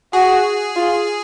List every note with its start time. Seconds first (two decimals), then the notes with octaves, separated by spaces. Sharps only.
0.13 F#4 G#4
0.76 F4